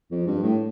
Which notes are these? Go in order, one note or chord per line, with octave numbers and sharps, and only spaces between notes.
F2
G2
A2